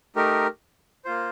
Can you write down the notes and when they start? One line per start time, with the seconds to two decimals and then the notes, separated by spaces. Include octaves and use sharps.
0.16 A3 D#4 G4 A#4
1.05 A#3 F4 C5